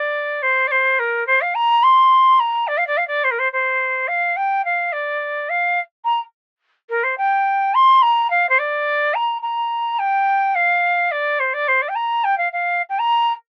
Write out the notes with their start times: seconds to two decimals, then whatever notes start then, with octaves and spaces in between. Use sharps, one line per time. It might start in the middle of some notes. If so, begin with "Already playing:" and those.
Already playing: D5
0.42 C5
0.67 D5
0.71 C5
0.99 A#4
1.27 C5
1.41 F5
1.55 A#5
1.83 C6
2.40 A#5
2.67 D5
2.77 F5
2.87 D5
2.97 F5
3.08 D5
3.24 C5
3.31 A#4
3.39 C5
3.52 C5
4.08 F5
4.37 G5
4.65 F5
4.92 D5
5.49 F5
6.05 A#5
6.89 A#4
7.03 C5
7.18 G5
7.74 C6
8.02 A#5
8.30 F5
8.49 C5
8.59 D5
9.14 A#5
9.42 A#5
9.99 G5
10.55 F5
11.11 D5
11.40 C5
11.54 D5
11.68 C5
11.82 D5
11.89 G5
11.95 A#5
12.24 G5
12.38 F5
12.53 F5
12.89 G5
12.99 A#5